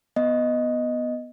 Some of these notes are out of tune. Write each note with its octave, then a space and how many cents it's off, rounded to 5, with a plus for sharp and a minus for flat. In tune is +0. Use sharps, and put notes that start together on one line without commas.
B3 +0 D#5 +0